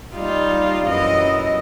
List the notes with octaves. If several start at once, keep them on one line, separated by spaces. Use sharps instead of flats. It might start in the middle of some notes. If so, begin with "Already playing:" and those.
G3 D#4 F4
F#2 E3 D#5